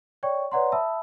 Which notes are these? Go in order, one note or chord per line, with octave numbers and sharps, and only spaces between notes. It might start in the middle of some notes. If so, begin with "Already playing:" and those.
C#5 D5 G5 C#6
B4 C#5 D5 F#5 A#5 C6
E5 A5 B5 D#6 E6